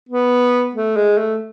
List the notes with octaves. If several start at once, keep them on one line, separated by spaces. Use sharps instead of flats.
B3
A3
G#3
A3